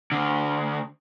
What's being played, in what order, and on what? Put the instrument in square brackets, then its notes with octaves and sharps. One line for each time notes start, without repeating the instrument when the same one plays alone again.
[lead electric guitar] D2 D3